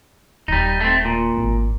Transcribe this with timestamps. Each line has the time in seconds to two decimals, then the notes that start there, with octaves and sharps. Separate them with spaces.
0.48 D#1 G3 D#4
0.81 A3 C4
1.05 A#2
1.37 G#1